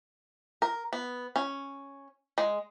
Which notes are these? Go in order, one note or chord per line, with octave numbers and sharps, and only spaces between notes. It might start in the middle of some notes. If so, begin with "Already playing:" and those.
A#4
B3
C#4
G#3